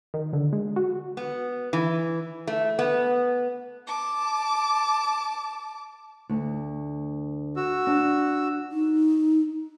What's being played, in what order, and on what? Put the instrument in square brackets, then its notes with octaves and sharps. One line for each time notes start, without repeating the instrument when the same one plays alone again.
[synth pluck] D#3
D3
G#3
F#4
[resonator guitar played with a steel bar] B3
E3
A3
B3
[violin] A5 D6
[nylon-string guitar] D2
[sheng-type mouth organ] F#4 E6
[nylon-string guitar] D4
[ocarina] D#4